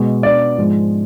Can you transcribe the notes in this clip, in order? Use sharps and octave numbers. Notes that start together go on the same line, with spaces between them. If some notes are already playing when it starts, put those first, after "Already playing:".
Already playing: B2 G#3
B2 B3 D4 D5
G#2 F3 G#3